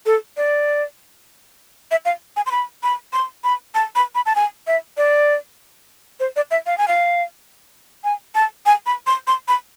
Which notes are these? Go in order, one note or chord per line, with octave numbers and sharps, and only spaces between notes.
A4
D5
E5
F5
G#5
C6
B5
B5
C6
B5
A5
B5
B5
A5
G#5
E5
D5
C5
D5
E5
F5
G#5
F5
G#5
A5
G#5
B5
C6
C6
B5